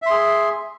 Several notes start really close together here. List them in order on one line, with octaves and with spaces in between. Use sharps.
E5 C6 G#4